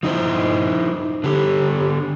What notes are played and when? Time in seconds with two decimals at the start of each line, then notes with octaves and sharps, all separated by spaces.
0.03 F3 D#4 E4 C5
1.24 D3 G4